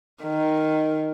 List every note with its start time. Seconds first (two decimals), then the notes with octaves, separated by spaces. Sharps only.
0.23 D#3